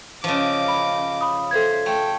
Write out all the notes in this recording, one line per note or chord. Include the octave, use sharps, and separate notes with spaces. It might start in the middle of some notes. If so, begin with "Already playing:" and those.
C#3 F3 D#5 D6
B5
B5 D#6
A4 C5 E5 G#6
A3 G5